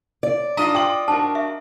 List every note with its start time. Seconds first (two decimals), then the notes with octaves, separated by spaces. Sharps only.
0.23 D5
0.57 D4 F4 D#5 A#5
0.75 F4 G5 D6 F#7
1.08 D4 F#4 A#4 A5
1.35 E5